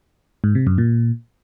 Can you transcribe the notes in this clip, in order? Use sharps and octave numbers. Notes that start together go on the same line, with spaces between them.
G#2
C3
F#2
A#2